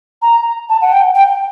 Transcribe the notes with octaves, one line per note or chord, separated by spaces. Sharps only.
A#5
A5
F#5
G5
G5